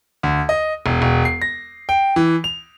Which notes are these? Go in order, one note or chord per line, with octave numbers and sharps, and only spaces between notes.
D2
D#5
E1
E1
C7
A#6
G5
E3
F7